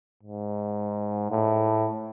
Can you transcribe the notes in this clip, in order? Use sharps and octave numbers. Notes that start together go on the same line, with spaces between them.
G#2
A2